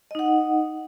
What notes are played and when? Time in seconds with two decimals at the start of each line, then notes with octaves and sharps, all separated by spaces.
0.11 D#5
0.15 D#4
0.19 F#5